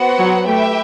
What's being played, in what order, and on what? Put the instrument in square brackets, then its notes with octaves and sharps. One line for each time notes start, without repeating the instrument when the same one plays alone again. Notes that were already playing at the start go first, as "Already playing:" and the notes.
Already playing: [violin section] B3 F#4 C5 F#5
[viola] F#3
[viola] A3 [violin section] G4 B4 E5 G5